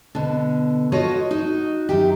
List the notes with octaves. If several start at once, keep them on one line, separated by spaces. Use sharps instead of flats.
B2 D3
F4 F#4 A4 C#5 D#5
D#4 F#4
F#2 D#3 G4